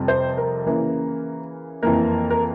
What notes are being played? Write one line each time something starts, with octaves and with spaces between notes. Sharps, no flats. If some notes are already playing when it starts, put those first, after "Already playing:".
Already playing: F2 C3 G3
C5
A#4
C#3 E3 A#3 C#4
F2 E3 A#3 A#4
A#4